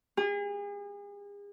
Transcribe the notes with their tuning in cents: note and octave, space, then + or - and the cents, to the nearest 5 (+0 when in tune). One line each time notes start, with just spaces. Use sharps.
G#4 -40